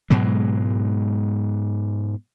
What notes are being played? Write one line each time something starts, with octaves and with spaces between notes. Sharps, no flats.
G#2 B2 F#3 G#3